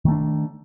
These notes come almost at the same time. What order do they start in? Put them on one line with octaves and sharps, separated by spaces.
D#3 A3 D4